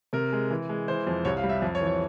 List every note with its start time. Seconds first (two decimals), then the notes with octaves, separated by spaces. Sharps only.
0.13 C3 A#4
0.32 G#3
0.50 E3
0.69 G#3
0.88 E3 C5
1.07 F2
1.25 C2 C#5
1.37 F5
1.43 G3
1.49 E5
1.62 F2
1.75 C#5
1.81 E3
1.87 C#5